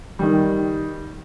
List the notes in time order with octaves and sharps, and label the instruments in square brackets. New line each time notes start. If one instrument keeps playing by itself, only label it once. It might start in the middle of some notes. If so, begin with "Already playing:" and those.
[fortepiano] D#3 G3